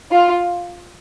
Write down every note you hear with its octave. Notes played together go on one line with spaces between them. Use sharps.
F4